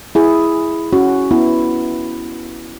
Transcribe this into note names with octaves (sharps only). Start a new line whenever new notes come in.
E4 G#4
C#4 F#4
B3 E4